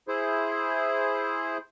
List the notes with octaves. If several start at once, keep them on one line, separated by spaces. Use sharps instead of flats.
E4 G#4 C5